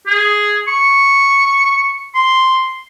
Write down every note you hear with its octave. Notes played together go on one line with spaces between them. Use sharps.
G#4
C#6
C6